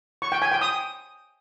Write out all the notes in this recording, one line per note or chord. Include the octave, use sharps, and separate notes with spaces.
C#6
G5
G#5
G5
D#6